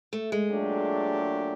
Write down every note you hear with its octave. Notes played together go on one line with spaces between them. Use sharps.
A3
G#3
A#2 F#3 A3 D4 G4